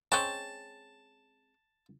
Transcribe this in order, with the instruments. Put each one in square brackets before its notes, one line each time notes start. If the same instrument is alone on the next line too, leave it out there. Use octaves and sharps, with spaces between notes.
[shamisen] G#3 C4 C#4 [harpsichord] A5